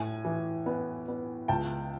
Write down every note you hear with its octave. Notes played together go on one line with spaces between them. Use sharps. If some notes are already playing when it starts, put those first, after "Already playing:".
Already playing: A2 G#5
E3
B3
B3
C#2 G5 A5